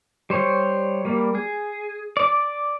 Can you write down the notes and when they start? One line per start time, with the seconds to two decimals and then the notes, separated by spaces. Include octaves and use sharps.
0.30 G3 C5 C#5
1.05 G3 A#3
1.35 G#4
2.17 D5 D6